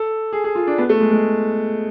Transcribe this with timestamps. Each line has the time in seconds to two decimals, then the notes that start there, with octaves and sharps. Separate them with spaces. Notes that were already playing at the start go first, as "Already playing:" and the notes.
Already playing: A4
0.33 G#4
0.44 G#4
0.55 F4
0.67 D4
0.78 B3
0.89 A3
1.01 G#3
1.12 G#3